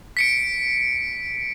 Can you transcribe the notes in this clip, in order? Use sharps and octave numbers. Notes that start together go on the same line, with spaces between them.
B6 C#7 D7